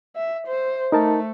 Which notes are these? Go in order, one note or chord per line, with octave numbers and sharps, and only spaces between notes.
E5
C5
A3 D#4 A#4 A5